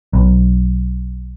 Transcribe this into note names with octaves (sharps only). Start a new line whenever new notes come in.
B1